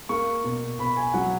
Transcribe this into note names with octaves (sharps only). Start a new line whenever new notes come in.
A#3 C#6
B2
B2 B5
G#5
F#3 F#5